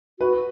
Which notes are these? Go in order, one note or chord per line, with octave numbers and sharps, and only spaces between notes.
F#4 B4